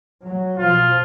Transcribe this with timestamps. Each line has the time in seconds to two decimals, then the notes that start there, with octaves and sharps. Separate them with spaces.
0.25 F#3
0.59 B1 F3 F4